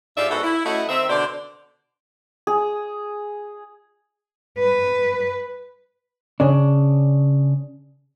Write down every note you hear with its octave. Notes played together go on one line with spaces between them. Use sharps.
G#2 F4 G4 A4 D5 E5
G#2 B3 F#4 A4
E4
A3 C#4 E4 F#4 A4 D#5
D#3 C4 E5
B2 D3 C5 D5
G#4
B4
C#3 D4